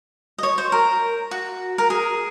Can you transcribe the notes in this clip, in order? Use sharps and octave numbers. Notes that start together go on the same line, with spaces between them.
D#5
C#5
C5
A#4
F#4
A#4
G#4